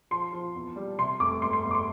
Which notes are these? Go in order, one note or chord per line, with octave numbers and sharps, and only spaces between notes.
F3 C6
F3
E2
G3
C3 C6
F1 D6
G1 C6
C6
G1
D6
C6